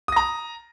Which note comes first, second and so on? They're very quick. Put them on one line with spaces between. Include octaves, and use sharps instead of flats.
D#6 A#6 A#5